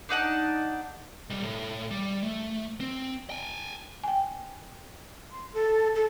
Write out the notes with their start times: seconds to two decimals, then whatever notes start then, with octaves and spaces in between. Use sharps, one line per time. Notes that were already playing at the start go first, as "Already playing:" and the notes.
0.09 D4 D#4 F#5 A5
1.30 B1 G3
1.44 A2
1.91 G3
2.24 A3
2.80 C4
3.30 G5 G#5
4.04 G5 G#5
5.31 C6
5.53 A4
5.95 A4